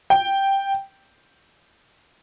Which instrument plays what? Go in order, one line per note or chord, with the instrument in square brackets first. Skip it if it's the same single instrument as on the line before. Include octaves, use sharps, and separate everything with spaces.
[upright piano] G5